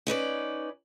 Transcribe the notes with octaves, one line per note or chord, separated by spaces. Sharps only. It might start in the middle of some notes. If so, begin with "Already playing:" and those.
C#4 D#4 B4 D5